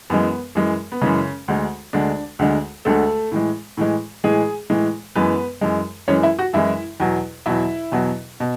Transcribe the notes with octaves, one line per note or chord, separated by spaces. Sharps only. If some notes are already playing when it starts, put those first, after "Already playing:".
F#2 E3 G#3 B3
F#2 E3 G#3
B3
F#2 C#3 E3 G#3 C#4
D2 D3 G#3
D2 D3 G#3 D4
D2 D3 G#3
D2 D3 G#3 A3 A4
A2 E3 G#3
A2 E3 G#3
A2 E3 G#3 G#4
A2 E3 G#3
F#2 E3 G#3 B3 B4
F#2 E3 G#3
F#2 E3 G#3 C#4 C#5
E4 E5
F#4 F#5
F#2 E3 G#3 E4 E5
E2 B2 F#3
E2 B2 F#3 E4 E5
E2 B2 F#3
B2